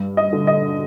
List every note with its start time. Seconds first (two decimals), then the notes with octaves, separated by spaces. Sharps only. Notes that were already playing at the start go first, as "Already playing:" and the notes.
Already playing: G2
0.17 D#5
0.33 D3
0.47 D#5